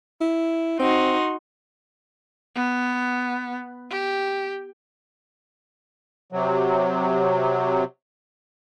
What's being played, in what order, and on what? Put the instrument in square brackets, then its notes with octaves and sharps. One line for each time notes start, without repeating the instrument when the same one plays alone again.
[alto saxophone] E4
[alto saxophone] C4 [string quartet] D#4 F#4 C6
[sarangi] B3
G4
[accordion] C3 F#3